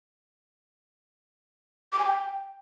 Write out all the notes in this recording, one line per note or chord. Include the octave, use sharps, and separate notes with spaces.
D6
G#5
G5